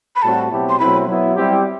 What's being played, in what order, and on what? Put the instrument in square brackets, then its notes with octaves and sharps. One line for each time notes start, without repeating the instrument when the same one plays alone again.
[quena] B5
[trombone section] A2 G3 C4 F#4 [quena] A5
[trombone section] B2 F#3 C4 E4 G4
[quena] C6
[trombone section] B2 F#3 A3 C4 E4 [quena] B5
[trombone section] F#3 B3 E4
G3 C4 E4 G4